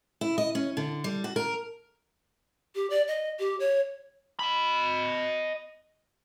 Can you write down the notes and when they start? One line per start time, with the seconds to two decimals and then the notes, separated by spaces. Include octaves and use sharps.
0.21 E4
0.38 D#5
0.55 C#4
0.77 D3
1.04 G3
1.24 F#4
1.36 A#4
2.75 G4
2.90 D5
3.08 D#5
3.39 G4
3.60 C#5
4.39 D#5 B5